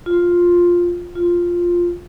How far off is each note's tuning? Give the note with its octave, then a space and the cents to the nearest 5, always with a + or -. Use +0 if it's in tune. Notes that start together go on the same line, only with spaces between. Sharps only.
F4 +5
F4 +0